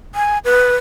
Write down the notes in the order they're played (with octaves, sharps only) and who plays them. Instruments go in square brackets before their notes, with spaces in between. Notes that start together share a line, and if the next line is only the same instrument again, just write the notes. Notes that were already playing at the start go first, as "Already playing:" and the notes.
[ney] G#5
B4